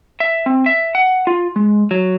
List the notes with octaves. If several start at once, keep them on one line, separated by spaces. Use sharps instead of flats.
E5
C4
E5
F#5
F4
G#3
F#3